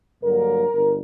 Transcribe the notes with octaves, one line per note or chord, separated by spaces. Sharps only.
G2 D3 F#3 A#3 A#4
G1